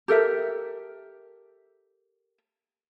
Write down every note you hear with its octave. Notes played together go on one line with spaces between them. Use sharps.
G4 A4 A#4 E5